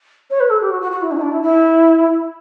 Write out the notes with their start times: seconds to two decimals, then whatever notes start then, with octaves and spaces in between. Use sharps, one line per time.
0.30 C#5
0.40 B4
0.50 A4
0.61 G4
0.70 F#4
0.81 F#4
0.91 F#4
1.01 E4
1.11 C#4
1.16 E4
1.21 D4
1.31 E4
1.42 E4